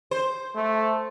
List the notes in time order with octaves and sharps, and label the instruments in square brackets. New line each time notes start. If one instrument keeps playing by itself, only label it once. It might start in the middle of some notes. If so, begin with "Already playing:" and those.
[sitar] C5
[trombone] A3